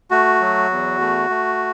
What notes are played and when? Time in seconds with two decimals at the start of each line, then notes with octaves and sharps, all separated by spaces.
0.11 A3 F#4
0.41 F#3
0.70 E2
1.00 A3
1.30 A3